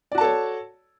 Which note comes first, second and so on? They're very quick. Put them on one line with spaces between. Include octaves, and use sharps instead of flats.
D5 F#4 A5 A4 C#5